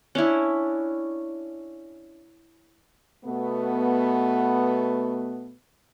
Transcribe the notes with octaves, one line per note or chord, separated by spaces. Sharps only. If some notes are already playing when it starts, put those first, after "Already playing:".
C#4 D4 E4
B2 A3 B3